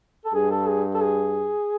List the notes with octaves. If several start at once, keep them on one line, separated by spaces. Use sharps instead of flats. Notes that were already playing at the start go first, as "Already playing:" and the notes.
A4
G2 G#4
A4
G#4
A4
G#4